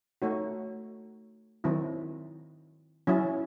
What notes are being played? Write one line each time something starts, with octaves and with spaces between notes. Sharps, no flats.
A3 D#4 F#4 C#5
D#3 F#3 C4 E4
F#3 C#4 E4